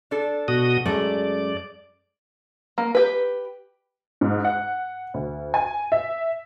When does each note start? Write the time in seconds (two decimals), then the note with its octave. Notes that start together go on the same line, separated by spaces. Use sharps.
0.11 D4 A4
0.48 B2 F#4 D#6
0.86 F#2 G#3 A3 D5
2.78 A#3
2.95 G4 B4
4.21 G#2
4.45 F#5
5.14 D2
5.54 G#5
5.92 E5